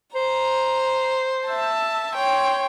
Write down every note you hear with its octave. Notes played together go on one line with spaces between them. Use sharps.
C5 A#5
E5 A5
C#5 G5 C6